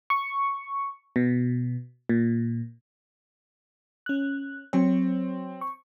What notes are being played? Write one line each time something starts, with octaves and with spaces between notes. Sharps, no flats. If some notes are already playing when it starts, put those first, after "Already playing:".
C#6
B2
A#2
C#4 F#6
F#3 C4 C#5
C#6